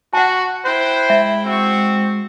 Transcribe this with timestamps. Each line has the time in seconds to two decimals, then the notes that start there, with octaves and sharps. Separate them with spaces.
0.13 F#4 F#5 A5
0.65 E4 C5 G5 F#6
1.10 G#3 E5
1.46 C4 F#4 C#6